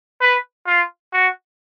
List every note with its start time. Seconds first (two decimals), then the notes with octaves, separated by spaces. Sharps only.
0.21 B4
0.67 F4
1.13 F#4